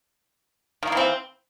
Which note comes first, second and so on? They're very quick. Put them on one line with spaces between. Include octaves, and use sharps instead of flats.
D#3 A#3 E3 C4